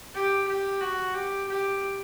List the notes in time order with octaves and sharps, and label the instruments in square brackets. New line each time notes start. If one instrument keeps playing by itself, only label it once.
[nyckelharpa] G4
G4
F#4
G4
G4